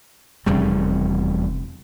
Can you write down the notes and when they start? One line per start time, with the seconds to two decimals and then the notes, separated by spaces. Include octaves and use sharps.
0.46 F1 E2 C#3 G3 A3